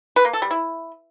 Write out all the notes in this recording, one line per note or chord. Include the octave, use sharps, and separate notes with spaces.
B4
A#3
A4
G3
E4